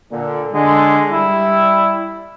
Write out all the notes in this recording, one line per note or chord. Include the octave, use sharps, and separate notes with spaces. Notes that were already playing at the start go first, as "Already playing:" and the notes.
A#2 D3
D3 G#3
G3 E4